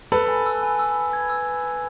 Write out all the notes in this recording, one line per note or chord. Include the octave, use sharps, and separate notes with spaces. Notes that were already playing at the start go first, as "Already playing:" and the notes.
A4 B4 B5
G#5
E6
G#5
E6
E6
G#6
E6